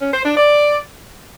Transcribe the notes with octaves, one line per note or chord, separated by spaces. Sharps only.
C#4
C5
D4
D5